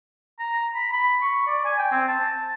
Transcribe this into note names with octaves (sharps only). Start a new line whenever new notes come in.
A#5
B5
B5
C#6
D5
G#5
G5
C4
A5